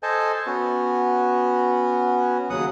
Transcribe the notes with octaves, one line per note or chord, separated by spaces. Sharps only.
A4 C5 D#5 G#5 A5
B3 C#4 F#4
D#2 C#3 F#3 F#5 D#6